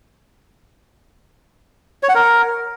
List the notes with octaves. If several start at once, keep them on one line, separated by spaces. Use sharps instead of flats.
C#5
F#5
A#4